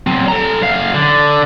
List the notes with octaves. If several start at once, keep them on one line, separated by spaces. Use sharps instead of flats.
F#3 C4
A4 A#5
F#2 F5
D3